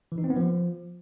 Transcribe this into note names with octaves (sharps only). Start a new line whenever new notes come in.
E3
D#4
C4
B3
F3